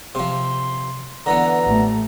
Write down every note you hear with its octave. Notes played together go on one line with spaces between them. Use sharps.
C3 F3 C6
D3 E3 B3 A#5
A1 A3